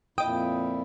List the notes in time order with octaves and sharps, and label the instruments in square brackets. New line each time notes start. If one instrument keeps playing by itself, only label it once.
[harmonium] F2 A#2 E4 [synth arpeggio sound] D#5 D#6 [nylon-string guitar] G5